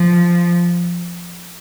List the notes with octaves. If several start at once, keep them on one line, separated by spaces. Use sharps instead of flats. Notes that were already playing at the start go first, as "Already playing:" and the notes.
Already playing: F3